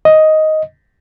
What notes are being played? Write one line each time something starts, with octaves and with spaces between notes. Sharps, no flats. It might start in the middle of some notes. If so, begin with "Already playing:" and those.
D#5